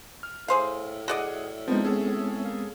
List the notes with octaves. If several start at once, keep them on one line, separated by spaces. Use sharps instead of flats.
F6
A2 G#4 C5 F5
F#4 G#4 D5 D#5 F#5
F3 G#3 B3 C4 D#4
C#4 G#4 A4
A#3